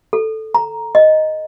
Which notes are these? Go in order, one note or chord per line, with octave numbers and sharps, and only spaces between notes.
A4
A#5
D#5